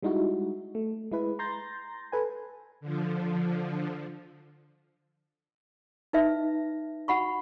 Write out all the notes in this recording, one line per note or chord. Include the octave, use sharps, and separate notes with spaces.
G3 G#3 D#4 E4 F#4
A3
G#3 E4 B4
A#5 C6 G6 A6 A#6
A4 B4 G#5
D3 F3
D#4 B4 E5
F#4 F#5 B5 C#6